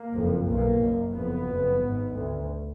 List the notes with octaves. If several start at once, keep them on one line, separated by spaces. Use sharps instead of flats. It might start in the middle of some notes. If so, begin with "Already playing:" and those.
Already playing: A#3
F#1 F2
B1 B2 A#3
F#1 F#2
F#1 F2 B3
F#1 F2
G#1 G#2
D2